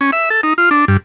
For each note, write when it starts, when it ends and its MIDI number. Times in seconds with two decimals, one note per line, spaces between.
0.01 0.11 61
0.12 0.29 76
0.30 0.41 69
0.43 0.53 63
0.58 0.69 65
0.71 0.85 62
0.88 0.97 43